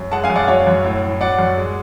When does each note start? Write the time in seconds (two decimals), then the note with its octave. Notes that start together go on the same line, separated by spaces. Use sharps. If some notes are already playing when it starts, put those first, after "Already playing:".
Already playing: F#2
0.12 G#3 F#5 A5
0.24 F5 G#5
0.30 F#2
0.36 D5 F#5
0.48 F#3 C#5 F5
0.67 F#2
0.84 A2
1.03 A2
1.21 F#3 D5 F#5
1.39 F#2
1.57 G#3